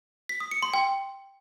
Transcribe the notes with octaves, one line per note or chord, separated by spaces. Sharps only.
B6
D#6
C#7
C6
G5